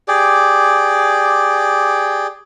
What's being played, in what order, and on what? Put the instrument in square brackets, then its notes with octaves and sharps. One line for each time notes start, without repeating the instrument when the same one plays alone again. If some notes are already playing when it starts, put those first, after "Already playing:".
[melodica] G4 G#4 D5